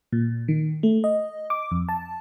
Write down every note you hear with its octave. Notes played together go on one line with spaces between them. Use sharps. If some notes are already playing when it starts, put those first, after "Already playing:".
A#2
D#3
A3
D#5
D6
F2
A5